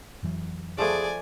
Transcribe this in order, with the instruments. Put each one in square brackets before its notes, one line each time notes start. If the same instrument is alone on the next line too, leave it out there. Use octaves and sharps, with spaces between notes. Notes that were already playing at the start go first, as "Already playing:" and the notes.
[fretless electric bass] F2 E3 F#3
[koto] F3 A3 B3 [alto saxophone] G#4 [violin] D5 G#5